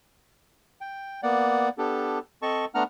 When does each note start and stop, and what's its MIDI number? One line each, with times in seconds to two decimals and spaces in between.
0.81 1.21 79
1.23 1.69 58
1.23 1.69 59
1.23 1.69 74
1.23 1.69 78
1.78 2.19 59
1.78 2.19 62
1.78 2.19 67
1.78 2.19 69
2.42 2.65 60
2.42 2.65 69
2.42 2.65 75
2.42 2.65 81
2.42 2.65 85
2.75 2.84 57
2.75 2.84 59
2.75 2.84 62
2.75 2.84 78
2.75 2.84 82
2.75 2.84 89